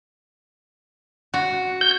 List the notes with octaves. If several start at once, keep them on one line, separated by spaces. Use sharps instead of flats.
F#4
G6